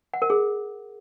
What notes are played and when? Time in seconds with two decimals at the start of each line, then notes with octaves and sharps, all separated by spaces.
0.14 F#5
0.22 A#4
0.30 G#4